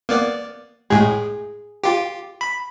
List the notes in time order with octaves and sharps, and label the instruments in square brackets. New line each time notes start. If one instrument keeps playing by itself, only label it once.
[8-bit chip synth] A#3 B3 D5
[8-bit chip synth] A2 G#3 [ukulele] G#4
[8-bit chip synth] F4 G4
B5